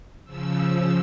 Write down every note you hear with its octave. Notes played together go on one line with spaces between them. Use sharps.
C#3 F3 E6